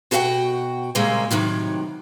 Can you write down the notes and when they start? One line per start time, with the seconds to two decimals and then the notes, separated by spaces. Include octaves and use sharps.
0.11 B2 F#4 A4 E5 F#5 G5
0.95 A#2 C#3 G3 G#3 A#3 C4
1.31 A2 C3 D#3 F#3